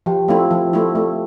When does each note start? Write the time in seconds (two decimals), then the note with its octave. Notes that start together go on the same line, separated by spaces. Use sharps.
0.06 F3 G4 G5
0.28 A3 C4 E4 F4 F5
0.51 F3
0.73 A3 C4 E4
0.95 A3